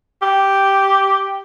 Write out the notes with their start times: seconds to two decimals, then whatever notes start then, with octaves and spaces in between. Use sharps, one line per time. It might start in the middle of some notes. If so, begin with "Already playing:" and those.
0.22 G4